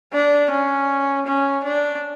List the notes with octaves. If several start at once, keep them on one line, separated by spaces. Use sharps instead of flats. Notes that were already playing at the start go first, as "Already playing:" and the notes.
D4
C#4
C#4
D4